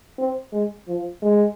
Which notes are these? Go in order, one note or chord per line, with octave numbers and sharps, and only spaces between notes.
C4
G#3
F3
G#3